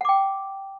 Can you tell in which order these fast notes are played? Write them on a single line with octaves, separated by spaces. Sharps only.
F#5 D6 G5